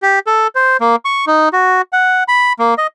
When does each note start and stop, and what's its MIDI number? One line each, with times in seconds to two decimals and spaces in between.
0.03 0.19 67
0.27 0.47 69
0.55 0.77 72
0.81 0.96 58
1.05 1.25 85
1.27 1.49 63
1.53 1.82 66
1.93 2.24 78
2.28 2.53 83
2.59 2.74 58
2.78 2.87 75